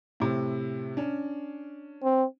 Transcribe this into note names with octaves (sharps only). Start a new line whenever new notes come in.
A2 C3
C#4 D4
C4